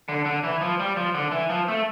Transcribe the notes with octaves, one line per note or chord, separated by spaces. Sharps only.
D3
D3
E3
F3
G3
F3
D3
E3
F3
A3